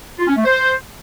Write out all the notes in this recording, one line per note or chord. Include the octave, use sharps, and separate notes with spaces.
F4
C#4
A3
C5